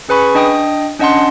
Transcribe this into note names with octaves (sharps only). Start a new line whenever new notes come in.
C#4 G#4 B4 G#5 B5 C#6
D4 D#5 G5 D#6
C#4 D4 D#5 F#5 A5 C6